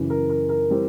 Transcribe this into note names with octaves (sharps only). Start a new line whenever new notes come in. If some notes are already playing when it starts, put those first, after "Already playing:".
Already playing: F#2 C#3 E3
A#4
A#4
A#4
E3 G3 C4